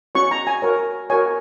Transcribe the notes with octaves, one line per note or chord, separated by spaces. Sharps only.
C#4 F#4 C#5 C#6
A#5
G#5
F#4 A#4 C#5
F#4 A#4 C#5 G#5